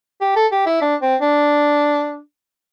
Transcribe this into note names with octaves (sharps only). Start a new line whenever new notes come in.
G4
A4
G4
E4
D4
C4
D4